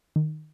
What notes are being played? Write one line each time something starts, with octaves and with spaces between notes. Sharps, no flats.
D#3